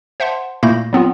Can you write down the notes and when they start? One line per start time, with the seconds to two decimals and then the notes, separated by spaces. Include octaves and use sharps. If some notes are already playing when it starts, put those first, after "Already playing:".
0.20 C5 E5 F#5 A5 C6
0.63 A#2 A3 A#3 E4 G6 A#6
0.93 F#3 B3 C4 F4